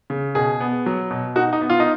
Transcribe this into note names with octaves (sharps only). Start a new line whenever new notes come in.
C#3
B2 G#4
B3
F#3
B2
D#4 F#4
D#4
B3
F4
D#4